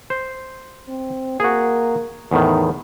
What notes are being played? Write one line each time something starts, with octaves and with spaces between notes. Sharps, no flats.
C5
C4
A#3 F#4 G#4
E2 A2 D#3 D#4